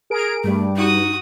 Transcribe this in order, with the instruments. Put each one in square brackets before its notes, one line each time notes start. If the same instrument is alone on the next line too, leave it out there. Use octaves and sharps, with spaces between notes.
[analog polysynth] G#4 A#4 D7
[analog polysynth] G2 [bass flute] G3 [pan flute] A3
[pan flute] D#4 [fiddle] F#4 D#6